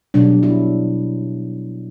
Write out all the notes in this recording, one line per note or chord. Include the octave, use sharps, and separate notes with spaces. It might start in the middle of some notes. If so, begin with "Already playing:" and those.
B2 F#3 G3 D4
E4